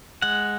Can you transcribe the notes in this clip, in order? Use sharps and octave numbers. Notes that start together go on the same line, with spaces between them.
G#3 F#5